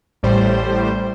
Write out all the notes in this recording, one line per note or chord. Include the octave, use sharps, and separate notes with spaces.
A1 A2 G3 C5